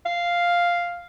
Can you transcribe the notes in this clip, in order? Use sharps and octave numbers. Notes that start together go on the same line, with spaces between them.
F5